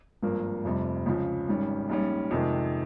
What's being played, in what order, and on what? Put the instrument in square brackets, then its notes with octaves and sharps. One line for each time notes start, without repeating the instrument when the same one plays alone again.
[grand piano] G#1 G2 F3 A#3
F1 F2 C3 G3 C4
C#2 C#3 F3
G#1 G#2 G3 C#4
A#1 G#2 G3 C#4
F2 C3 D#3 G#3